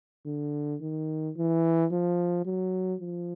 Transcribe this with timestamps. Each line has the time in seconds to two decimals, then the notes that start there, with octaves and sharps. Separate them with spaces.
0.26 D3
0.81 D#3
1.37 E3
1.91 F3
2.45 F#3
3.01 F3